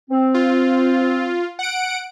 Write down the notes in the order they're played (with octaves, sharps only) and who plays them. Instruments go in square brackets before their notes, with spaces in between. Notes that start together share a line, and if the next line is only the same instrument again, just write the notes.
[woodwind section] C4
[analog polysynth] F4
F#5 D7